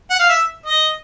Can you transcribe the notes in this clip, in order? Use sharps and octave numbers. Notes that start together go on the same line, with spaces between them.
F#5
F5
E5
D#5